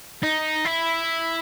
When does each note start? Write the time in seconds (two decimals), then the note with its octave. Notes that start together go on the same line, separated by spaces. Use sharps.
0.23 D#4
0.65 E4